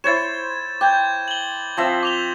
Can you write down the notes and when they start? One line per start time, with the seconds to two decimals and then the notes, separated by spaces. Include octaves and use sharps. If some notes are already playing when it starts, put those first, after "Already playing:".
0.04 E4 C5 C#5 A6 E7
0.81 G5 D6 G6 G#6
1.28 F#7 G7
1.77 F3 C4 E5
2.03 D6 F7 G7